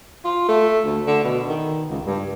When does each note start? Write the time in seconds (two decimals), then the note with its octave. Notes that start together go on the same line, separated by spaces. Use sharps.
0.25 F4
0.49 A3
0.85 D2
1.07 D3
1.24 B2
1.48 D#3
1.90 C#2
2.05 G2